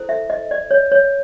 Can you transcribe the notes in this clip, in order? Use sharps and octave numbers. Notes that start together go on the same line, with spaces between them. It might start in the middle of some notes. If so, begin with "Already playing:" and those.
Already playing: E4 A4 C5
E5
D#5
D5
C#5
C#5